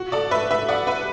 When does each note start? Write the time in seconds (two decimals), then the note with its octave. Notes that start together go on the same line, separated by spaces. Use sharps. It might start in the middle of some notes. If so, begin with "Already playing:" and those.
Already playing: F#4
0.12 A4 D5
0.31 B4 E5
0.51 B4 E5
0.68 D5 F#5
0.87 B4 E5